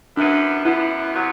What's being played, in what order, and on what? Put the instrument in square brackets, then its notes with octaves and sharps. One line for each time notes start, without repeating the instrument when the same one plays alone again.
[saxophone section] F#2 E3 B3 [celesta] D4
[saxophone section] F#2 E3 B3 [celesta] E4
[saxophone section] C3 F#3 B3